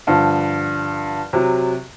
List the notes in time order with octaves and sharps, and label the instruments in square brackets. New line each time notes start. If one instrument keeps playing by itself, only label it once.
[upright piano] G2 D3 F3
C3 F#3